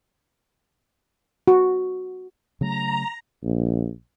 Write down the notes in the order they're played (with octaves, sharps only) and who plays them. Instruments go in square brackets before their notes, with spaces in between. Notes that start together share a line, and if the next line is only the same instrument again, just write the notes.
[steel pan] F#4
[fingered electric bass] C#3 F#3 A3 [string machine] A#5
[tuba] A#1